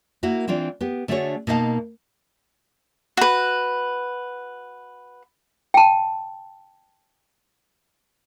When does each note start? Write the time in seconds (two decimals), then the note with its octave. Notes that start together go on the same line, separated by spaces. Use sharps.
0.23 A#3 E4 F#4
0.48 E3 C4 D4 F4 D5
0.81 B3 G4
1.08 D3 A3 D4 F#4 G#4 C#5
1.47 B2 A#3 D#4 E5 F5 A5
3.17 F#4 B4
5.74 G5 A5